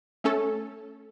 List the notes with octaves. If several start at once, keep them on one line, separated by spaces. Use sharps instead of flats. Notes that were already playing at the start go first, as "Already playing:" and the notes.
A3 C#4 A4